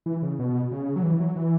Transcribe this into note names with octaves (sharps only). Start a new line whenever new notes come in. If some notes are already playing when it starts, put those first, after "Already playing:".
E3
C#3
B2
C#3
F#3
E3
F#3
E3